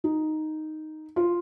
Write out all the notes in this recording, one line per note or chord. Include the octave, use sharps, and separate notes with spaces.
D#4
F4